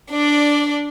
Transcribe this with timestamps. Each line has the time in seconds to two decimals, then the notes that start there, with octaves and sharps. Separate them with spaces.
0.11 D4 D5